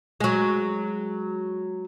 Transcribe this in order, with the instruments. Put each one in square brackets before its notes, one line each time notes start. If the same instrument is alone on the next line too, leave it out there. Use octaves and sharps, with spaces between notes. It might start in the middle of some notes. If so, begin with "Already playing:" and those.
[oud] F#3 G#3